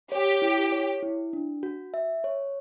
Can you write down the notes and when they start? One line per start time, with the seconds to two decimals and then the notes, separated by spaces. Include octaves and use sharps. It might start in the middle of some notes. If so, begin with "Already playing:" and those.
0.11 G4 C#5
0.42 E4
0.72 C#5
1.03 E4
1.33 D4
1.63 F#4
1.94 E5
2.24 C#5